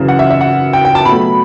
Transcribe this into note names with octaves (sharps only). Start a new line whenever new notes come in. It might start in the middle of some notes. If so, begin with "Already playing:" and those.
Already playing: F#2 C#3 E3
F#5
E5
E5
F#5
G5
G5
A5
B2 F#3 A3 B5